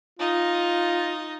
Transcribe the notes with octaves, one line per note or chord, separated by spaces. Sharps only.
D#4 F4 D#5